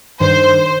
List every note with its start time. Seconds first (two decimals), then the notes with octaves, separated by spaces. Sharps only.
0.20 G2 D#3 C5